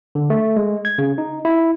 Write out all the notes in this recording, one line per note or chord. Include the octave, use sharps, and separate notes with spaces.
D3
A3
G#3
G#6
C#3
D#4
E4